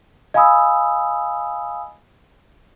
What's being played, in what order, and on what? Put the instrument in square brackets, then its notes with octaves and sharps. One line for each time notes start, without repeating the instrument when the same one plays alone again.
[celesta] D#5 F5 G#5 B5 D#6 E6